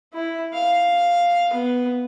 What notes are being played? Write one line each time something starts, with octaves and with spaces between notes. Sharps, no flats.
E4
F5
B3